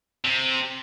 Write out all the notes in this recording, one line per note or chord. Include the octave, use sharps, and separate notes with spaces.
C3